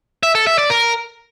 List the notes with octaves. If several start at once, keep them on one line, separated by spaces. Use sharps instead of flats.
E5
A4
E5
D5
A#4